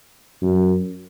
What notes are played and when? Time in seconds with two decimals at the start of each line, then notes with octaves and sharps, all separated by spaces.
0.42 F#2